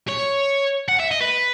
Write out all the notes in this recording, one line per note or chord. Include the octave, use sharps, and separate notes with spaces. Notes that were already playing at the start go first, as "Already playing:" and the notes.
C#5
F#5
E5
D#5
B4